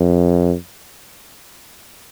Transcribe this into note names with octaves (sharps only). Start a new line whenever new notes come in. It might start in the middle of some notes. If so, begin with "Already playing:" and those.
Already playing: F2